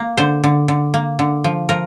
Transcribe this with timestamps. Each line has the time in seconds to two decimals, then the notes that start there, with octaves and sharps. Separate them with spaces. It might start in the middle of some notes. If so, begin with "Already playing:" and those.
Already playing: A#3
0.17 D3 C5
0.44 D3
0.68 D3
0.94 A#3
1.19 D3
1.44 F3
1.69 F3 A#4